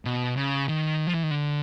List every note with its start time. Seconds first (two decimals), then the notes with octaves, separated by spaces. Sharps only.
0.05 B2
0.37 C#3
0.69 D#3
1.07 F3
1.14 E3
1.23 D#3
1.31 D3